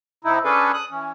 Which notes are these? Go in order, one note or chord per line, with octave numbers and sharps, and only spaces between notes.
C3 D#4 E4
C#4 D4 G#4 A4 B4
D#6 F#6
E3 C#4